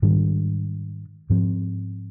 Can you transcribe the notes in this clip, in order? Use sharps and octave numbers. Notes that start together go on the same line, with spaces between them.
G#2 D#3 G3 D4
G#2 F3 C4